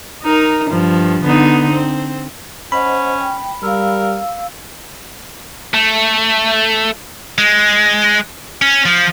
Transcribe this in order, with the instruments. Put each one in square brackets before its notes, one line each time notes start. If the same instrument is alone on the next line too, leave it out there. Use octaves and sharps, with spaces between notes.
[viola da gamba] D#4 A#4
G2 F3
D3 B3 D#4
C4
[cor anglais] C#4 [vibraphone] C5 D#5 F#5 [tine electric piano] B5
[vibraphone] G5
[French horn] G3 [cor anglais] A#4 [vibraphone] F5 E6
[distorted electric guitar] A3
G#3
C#4
F3